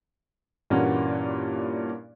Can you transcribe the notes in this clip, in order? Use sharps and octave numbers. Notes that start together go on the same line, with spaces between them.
G2 A#2 E3 A#3 C#4 F#4